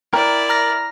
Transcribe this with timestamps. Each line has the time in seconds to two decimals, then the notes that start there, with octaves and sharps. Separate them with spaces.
0.14 E4 A#4 D5 G5
0.49 A#5 F6 A#6